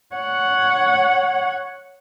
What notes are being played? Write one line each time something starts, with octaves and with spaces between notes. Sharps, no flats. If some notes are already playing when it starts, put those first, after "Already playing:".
C#5 F#5